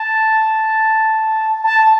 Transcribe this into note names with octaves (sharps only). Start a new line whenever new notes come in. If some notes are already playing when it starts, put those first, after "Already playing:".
Already playing: A5
A5